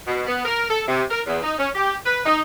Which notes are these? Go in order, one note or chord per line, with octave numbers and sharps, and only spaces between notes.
B2
B3
A#4
A4
C3
A#4
E2
D#4
C#4
G4
B4
D#4